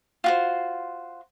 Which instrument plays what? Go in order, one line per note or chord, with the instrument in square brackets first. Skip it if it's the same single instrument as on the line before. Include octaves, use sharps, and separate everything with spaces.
[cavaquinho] F4 F#4 C5